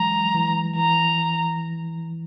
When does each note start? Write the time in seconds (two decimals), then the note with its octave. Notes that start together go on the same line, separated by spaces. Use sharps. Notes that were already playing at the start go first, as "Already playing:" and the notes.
Already playing: E3 F#3 G#3 A#5
0.34 E3
0.76 E3 A#5